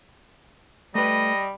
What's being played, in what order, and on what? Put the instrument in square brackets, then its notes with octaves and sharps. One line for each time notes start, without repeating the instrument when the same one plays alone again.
[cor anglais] G3 [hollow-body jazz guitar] A3 B4 [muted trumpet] D#5